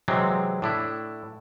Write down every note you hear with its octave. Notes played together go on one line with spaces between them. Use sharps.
C3 E3 F#3 G#3 C4
A2 D4 E4